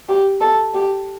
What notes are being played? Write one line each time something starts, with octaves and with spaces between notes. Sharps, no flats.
G4
A4
G4